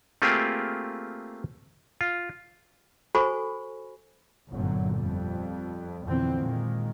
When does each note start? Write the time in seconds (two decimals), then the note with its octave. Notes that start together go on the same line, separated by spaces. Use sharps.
0.22 A3 A#3 C4 F4 G4 G#4
2.01 F4
3.15 F#4 A4 C5 G#5 B5 C#6
4.51 G1 F#2 A#2 D3 F#3
4.96 F2 G3
6.05 F2 B2 D3 E3 C4
6.39 A#2 D#3 G#3 A#3